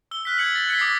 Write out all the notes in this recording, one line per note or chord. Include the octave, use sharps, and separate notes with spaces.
E6 G7
F6 F#6 B6
G6 G#6 C#7 F#7
A6
F#6 G#6 B6 C#7 G7
D6 D#6 A6 A#6 C7